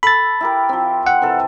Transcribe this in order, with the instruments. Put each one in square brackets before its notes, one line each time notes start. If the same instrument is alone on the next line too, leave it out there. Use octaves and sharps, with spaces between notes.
[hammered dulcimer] A4 [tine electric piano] B5 A6
[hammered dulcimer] E4 G4 A#4
F3 C4
[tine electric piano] F#5
[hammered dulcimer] C3 E3 A4